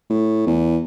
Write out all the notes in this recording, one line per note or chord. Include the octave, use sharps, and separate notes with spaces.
A2
E2